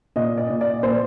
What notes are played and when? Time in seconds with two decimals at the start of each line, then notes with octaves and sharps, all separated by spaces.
0.16 A#2 D#5
0.37 D5
0.50 A#2
0.61 D5
0.83 A#2 C5